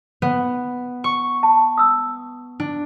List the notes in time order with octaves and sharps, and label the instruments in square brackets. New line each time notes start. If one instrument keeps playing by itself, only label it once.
[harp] B3
C#6
[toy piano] A5
D#6 E6
[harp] D4